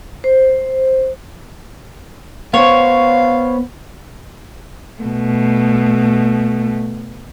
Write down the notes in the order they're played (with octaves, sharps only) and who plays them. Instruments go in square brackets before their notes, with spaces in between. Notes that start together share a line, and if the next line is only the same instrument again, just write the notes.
[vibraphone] C5
[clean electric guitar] B3 C5 [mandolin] C#5 [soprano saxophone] F5
[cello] B2 A3